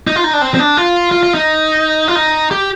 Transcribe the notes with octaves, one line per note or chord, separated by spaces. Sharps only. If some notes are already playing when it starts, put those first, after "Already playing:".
D#4
F4
D#4
D4
C4
C4
D4
F4
F4
F4
D#4
F4
D#4
G4